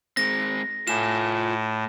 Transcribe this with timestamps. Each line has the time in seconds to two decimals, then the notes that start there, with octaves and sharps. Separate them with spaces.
0.17 G#3 C4 A#6
0.88 A2 F4 G#5 E7